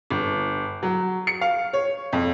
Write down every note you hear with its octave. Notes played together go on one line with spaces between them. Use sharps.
G1
F#3
C#7
F5
C#5
F2